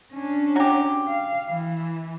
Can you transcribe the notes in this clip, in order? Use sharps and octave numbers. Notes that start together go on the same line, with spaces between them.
C#4 D4
F#3 G4
F5
E3